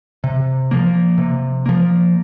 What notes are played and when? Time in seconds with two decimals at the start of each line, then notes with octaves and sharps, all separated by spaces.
0.24 C3
0.71 F3 A#3
1.18 C3
1.66 F3 A#3